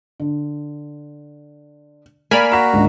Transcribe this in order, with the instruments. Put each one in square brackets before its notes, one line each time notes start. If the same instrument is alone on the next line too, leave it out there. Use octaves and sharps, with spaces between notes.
[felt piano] D3
[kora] A#3 D5 [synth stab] G#5 B5 F6
[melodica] F#4 A#5 [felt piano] B6 E7
[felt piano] C#2 G#2 D3